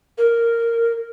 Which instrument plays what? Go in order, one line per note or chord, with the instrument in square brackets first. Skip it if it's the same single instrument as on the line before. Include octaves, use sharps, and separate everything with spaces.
[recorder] A#4